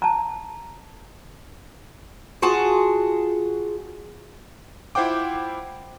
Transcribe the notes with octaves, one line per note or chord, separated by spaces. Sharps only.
A5 A#5
F4 F#4 G#4 A5
E4 F4 C5 F#5 G5 D6